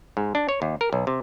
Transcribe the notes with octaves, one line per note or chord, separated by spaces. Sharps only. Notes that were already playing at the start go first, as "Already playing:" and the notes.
G#2
D4
C#5
D#2
A#4
B1
C3